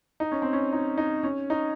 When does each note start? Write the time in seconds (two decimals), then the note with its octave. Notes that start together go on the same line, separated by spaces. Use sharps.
0.20 D#4
0.32 C#4
0.42 C4
0.53 C#4
0.72 D#4
0.98 D#4
1.23 C#4
1.50 D#4